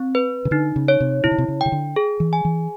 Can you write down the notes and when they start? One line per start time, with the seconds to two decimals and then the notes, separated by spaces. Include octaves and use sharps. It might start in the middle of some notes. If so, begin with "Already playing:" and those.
Already playing: C4
0.15 B4
0.45 C#3
0.51 D3 D#4
0.76 C#3
0.88 C#5
1.00 C3
1.24 C3 E4
1.31 C#3
1.38 C3
1.48 C#3
1.61 C#3 G5
1.72 D3
1.96 G#4
2.20 E3
2.33 G#5
2.45 E3